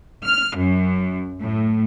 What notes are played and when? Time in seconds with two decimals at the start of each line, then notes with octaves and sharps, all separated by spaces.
0.25 F6
0.57 F#2
1.42 A2